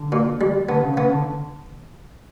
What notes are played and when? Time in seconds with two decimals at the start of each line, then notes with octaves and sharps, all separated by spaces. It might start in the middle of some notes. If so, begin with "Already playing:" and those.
Already playing: D3
0.12 A#2
0.41 G3
0.69 D3 B3
0.83 C#3
0.97 C#3 B3
1.12 D3